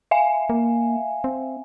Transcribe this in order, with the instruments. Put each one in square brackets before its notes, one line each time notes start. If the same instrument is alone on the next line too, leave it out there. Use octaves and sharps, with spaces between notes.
[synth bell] E5 F5 G#5
[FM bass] A#3
C4